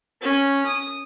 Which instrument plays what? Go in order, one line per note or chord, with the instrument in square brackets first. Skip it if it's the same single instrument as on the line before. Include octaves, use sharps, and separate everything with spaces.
[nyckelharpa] C#4
D#6